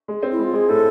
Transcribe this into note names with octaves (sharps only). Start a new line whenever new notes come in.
G#3
C4
E4
G#3 F4
G#3 G#4
A2 A4